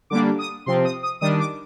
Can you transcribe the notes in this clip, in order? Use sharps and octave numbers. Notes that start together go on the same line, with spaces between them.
D3 G3 A#3 D4 D6
D#6
C3 F3 C4 C6
D#6
D#6
D#3 G3 D4 D#6
D6